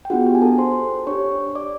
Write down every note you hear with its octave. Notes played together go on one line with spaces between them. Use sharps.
G5
B3 D4 F4 F#4 G#4 F#5
G4 G5
G#5
A4 A5
C5 C6
D4 G4 C#5 C#6
D5 D6